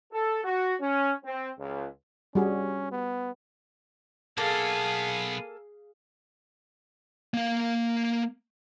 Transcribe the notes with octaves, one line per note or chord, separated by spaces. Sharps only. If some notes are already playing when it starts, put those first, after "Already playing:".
A4
F#4
C#4
C4
C#2
G3 C#4 F#4 G#4
B3
B1 A#3 B3 G#4 A4 F5
A#3 F5